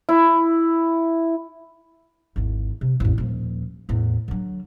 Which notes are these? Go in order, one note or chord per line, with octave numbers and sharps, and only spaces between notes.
E4
G#1 E2
C3
A1 F2
D#1 F3
E2 A2
D3 F#3